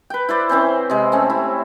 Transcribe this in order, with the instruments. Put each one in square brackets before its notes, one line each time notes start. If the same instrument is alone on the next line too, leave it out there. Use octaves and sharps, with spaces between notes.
[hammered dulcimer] B4 G5
E4 C5 D5
E3 C4 C#4 C5
C3 G#3
A3 C4 C#4
E4